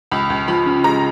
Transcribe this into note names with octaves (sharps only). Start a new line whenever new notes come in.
C#2 B5
C#2
F3 B5
C#3
G#3 A#5